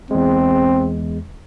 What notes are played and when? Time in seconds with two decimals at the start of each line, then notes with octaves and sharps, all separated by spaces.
0.11 E2 G#3 C4